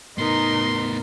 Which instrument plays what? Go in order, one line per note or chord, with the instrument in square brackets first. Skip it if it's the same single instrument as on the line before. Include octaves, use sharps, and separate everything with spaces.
[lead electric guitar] A2 B3 [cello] D#4 [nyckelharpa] A#4 [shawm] C6